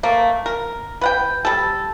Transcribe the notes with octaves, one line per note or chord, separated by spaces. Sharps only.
A3 A#3
A#4
B4 F#5 G5
G3 A4